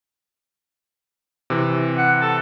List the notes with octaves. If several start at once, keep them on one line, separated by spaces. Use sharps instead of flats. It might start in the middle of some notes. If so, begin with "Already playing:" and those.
C3 E3
F#5
A4